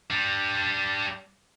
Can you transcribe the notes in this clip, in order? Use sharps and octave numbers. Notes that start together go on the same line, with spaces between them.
G3 D4